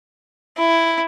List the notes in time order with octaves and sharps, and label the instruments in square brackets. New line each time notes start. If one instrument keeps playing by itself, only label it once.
[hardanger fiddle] E4